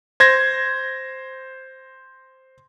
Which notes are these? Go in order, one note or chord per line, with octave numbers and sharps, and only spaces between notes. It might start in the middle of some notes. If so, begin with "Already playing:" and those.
C5 G#6 A#6